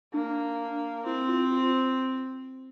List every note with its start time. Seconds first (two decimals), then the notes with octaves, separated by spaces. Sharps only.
0.14 A#3 D4
1.05 C4 E4
1.28 F4
1.52 F4
1.62 F4